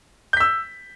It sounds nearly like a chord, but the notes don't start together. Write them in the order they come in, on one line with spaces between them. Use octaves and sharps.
G6 B6 E6